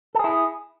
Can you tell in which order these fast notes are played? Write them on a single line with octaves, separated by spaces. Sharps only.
A4 G#4 E4